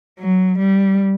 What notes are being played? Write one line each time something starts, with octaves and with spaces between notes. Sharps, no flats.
F#3
G3